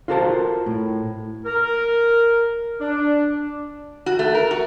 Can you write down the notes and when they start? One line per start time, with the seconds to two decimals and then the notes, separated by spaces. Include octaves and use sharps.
0.08 F4 F#4 A4 A#4 C5 A5
0.66 A2
1.46 A#4
2.80 D4
4.06 F#4
4.19 A3
4.35 A#4
4.51 F#4